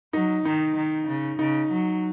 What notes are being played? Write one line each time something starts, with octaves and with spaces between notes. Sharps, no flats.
F#3 D#4
D#3 D#4
D#3
C#3
C#3 D#4
F#3